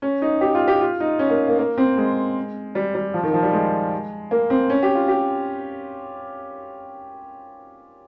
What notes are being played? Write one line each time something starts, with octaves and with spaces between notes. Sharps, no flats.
C#4
D#4
G4
F4
G4
F4
D#4
C#4
A#3
A#3
A#3
C4
G#3
G3
G3
F3
D#3
F3
G3
G#3
A#3
C4
C#4
G4
F4
G4